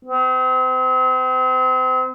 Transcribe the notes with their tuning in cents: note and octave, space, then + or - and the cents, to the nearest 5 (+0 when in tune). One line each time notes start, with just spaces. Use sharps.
C4 -35